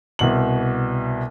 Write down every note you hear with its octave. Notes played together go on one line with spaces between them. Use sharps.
C2 B2 F#7